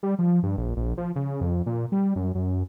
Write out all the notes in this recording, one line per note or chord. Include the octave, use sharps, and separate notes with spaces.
G3
F3
G2
A#1
A#1
F3
C#3
F2
A#2
G3
F#2
F#2